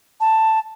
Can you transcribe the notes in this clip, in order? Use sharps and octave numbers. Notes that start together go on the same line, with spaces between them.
A5